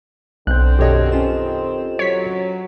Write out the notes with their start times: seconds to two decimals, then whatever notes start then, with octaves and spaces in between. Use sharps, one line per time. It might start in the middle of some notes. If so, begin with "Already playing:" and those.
0.47 B1 D3 C4 F#6 G6
0.79 F#2 B2 G4 A4 C#5 D#5
1.12 D#3 C4 C#4 F4 E7
1.99 F#3 C#5 B6